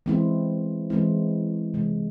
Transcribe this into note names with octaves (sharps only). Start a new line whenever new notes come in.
E3 G#3 C4 E4
E3 G#3 C4 E4
C3 E3 G#3